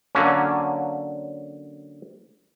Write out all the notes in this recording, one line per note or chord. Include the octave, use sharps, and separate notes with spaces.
D3 F#3 A#3 C#4